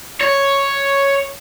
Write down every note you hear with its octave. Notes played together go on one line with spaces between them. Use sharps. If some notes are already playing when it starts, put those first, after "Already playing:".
C#5